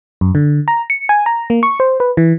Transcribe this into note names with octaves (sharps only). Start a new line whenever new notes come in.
F#2
D3
A#5
C#7
G#5
A#5
A#3
C#6
C5
B4
E3